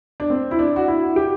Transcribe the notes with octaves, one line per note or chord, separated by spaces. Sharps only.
D4
C4
E4
D4
F#4
E4
G4